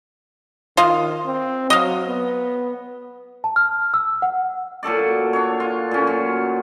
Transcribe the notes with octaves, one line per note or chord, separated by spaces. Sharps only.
D#3 F4 D#5 F5
C4
F#3 D#5 F5
B3
A5
F6
E6
F#5
A#2 F#3 A4 D5
D4 C#5
F4
A#2 C#4
F#3